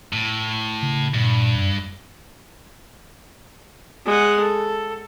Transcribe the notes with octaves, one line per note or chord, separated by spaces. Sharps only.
A2
C#3
G2 A#2
F#2
G#3 F#5
A4